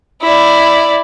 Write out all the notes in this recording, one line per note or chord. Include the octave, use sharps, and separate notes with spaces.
E4 D5